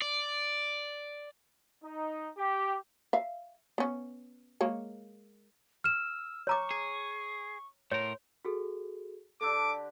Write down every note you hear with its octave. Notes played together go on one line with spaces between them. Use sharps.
D5
D#4
G4
E5 F5
B3 C#4
G#3 A#3 C#5
E6 F6 E7
C#5 A#5 C#6 D6
G#4
A2 A#4 C#5 C6
F#4 G#4 A4
D3 D4 G4 A4 D6 E6